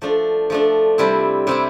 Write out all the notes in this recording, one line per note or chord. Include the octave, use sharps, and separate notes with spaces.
F3 A3 D4
F3 A3 D4
C3 G3 C4 E4
C3 G3 C4 E4